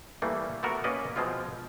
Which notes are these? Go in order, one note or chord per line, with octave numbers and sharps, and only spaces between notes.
E3 G3 A3 A#3
A3 B3 F#4 A#4
A#3 C#4 B4 D5 D#5
B2 F3 G#3 C4 F4